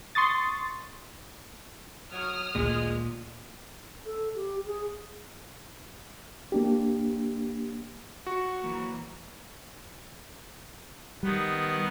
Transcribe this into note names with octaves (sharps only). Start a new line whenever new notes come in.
C6 C#6 D#6 A6
F#3 C#6 D#6 F6 G#6
G#1 D2 A#2 G#3
A4
G4
G#4
A#3 D4 G4
F#4 C#6
E3 F#3 A#3
D#3 G3 B3